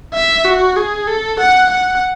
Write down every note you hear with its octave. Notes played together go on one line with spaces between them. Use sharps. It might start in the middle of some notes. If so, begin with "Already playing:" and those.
E5
F#4
G#4
A4
F#5
F#5